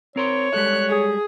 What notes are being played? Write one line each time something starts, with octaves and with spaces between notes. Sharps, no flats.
C4 A#4 C5 C#5
G3 G#3 A4 F#6
G#4